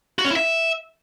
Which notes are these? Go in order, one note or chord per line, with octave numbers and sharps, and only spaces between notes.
F#4
C#4
E4
E5